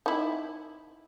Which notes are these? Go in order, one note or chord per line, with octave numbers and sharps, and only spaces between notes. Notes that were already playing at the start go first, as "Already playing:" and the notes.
D#4 E4